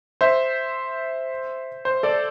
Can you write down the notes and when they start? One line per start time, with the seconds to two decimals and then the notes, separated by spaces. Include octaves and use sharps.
0.21 C5 E5
1.85 C5
2.03 A4 D5